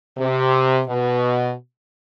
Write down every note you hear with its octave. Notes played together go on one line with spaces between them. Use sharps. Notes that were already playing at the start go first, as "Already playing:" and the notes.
C3
B2